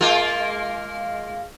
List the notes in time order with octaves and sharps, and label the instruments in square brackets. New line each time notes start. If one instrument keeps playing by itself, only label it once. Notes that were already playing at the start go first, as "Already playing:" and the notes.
[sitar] G#3 A#3 F4